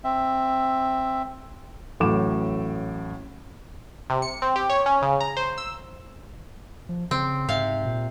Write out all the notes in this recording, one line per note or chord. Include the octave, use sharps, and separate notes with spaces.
C4 E5
A1 A2 F#3 D6 E7
C3
C#7
C4
G4
C#5
C#4
C#3
A#5
C5
E6
F3
C#3 C4
G#2 C3 F5
A#2